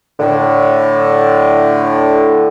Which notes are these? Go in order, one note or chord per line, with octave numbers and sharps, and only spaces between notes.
A2 D3